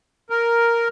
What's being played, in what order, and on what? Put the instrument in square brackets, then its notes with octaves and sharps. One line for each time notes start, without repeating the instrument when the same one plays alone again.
[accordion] A#4